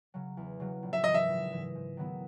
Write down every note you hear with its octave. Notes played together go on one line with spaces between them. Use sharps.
C#3 F#3
E2
C#3 F#3
A#1
E5
G#2 E3 D#5
E5
A#1
G#2 E3
G#2
D#3 F#3 B3 E4